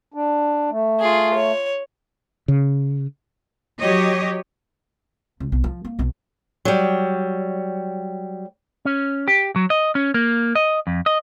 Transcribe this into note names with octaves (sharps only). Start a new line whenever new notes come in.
D4
A3
F4 G#4
C#5
C#3
F#3 G4 C#5 D#5
C#2
B1
F3
A#3
B1 B2
F#3 G3
C#4
G4
F#3
D#5
C#4
A#3
D#5
F2
D#5